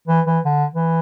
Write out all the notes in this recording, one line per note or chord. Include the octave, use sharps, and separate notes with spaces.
E3
E3
D3
E3